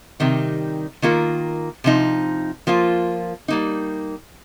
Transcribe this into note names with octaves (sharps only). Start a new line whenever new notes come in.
C3 D#3 G3 D#4
D#3 A#3 F4 A#4
C3 F3 D#4
F3 A#3 F4
G3 A#3 D#4